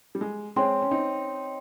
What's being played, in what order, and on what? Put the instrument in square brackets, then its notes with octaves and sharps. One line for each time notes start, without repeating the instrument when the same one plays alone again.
[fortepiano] G3
G#3
[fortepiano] G#3 C4 [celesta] C#5 G5 C6
[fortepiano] C#4
C4 D#4